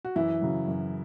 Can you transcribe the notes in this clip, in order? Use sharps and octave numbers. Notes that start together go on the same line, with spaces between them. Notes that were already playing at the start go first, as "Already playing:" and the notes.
F#4
F#2 E3 E4
C#3 F#3
F#2